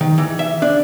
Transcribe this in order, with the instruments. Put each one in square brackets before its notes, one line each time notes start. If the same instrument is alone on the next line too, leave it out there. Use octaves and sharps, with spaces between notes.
[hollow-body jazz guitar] D#3
E3
E5
D4